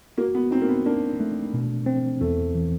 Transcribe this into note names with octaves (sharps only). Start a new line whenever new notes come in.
A#3 F#4
B3
C4 D#4
A#3
B3
A#3 D4
A3
B2
C4
E2 A3
E3